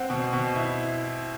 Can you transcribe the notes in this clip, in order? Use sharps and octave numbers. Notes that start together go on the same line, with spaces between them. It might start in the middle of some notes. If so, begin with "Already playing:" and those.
Already playing: C4 F#5
B2
B2
E4